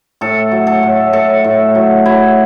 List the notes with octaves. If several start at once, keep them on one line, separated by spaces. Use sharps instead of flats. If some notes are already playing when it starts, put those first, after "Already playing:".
A2 A4
F#3
A4
A2
A2 A4
A2
F#3
F#3 E4